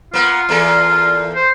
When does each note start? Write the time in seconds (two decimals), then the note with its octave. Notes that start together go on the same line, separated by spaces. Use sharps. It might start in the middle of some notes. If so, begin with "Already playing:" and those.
0.14 A#3 B3 F4
0.49 E2 A#3 A4
1.35 C5